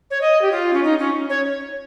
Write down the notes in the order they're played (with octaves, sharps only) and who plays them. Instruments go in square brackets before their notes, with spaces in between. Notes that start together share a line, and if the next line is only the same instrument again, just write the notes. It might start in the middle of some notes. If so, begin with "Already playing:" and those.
[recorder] C#5
D#5
G4
F4
C#4
D#4
C#4
C#5